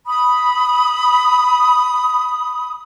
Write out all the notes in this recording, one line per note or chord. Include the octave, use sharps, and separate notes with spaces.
B5 D#6